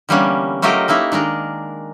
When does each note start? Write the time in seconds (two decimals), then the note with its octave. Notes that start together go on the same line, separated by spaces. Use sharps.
0.09 D3 E3 G3 A#3 B3 C#4
0.62 F#3 A3 F4 G4 A#4 D#5
0.88 A3 A#3 D#4 E4
1.12 D#3 G#3 D4 A#4